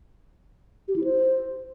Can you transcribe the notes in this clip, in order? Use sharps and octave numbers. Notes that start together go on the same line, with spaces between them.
G4
E4
C5